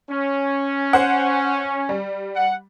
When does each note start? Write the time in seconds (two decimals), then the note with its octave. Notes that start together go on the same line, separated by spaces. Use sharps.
0.11 C#4
0.93 C5 F#5
1.89 G3
2.36 F#5